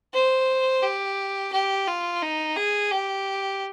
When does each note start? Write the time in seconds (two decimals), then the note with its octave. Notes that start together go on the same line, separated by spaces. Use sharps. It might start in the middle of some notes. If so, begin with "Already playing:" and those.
0.13 C5
0.82 G4
1.52 G4
1.87 F4
2.22 D#4
2.56 G#4
2.91 G4